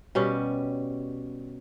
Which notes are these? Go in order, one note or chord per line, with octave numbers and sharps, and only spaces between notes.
B2 G3 C#4 G4